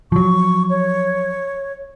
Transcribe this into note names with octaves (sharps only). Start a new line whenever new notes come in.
F3 F#3 C#6
C#5